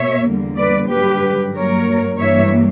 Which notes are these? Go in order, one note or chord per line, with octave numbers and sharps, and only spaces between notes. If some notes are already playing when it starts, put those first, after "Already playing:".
Already playing: B2 A#3 C#5 E5
E2 D3 G3 A#3
B4 D5
G2 D3 F#3 G4 B4
G2 F#3 A#3 A#4 C#5
G2 E3 G3 A#3 C#5 E5